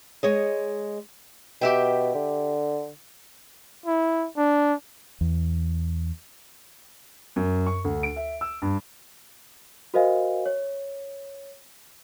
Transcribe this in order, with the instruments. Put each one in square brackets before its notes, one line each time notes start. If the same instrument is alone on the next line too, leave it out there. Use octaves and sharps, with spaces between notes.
[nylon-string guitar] G#3 C#5 D#5
[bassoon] B2 [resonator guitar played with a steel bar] G4 E5 G5
[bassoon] D3
[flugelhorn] E4
D4
[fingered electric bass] E2
[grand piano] F#2
C#6
D2
D7
E5
E6
G2
[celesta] F#4 A#4 C5 D#5 F5 G#5
C#5